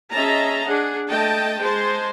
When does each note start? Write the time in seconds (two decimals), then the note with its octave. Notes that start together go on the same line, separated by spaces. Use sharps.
0.13 C#4 G#4 D#5 E5 A5 A#5
0.66 D4 G#4 F#5
1.09 A3 D#5 G5 A5
1.60 G#3 C5 A5